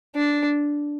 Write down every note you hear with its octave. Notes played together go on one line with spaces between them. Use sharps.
D4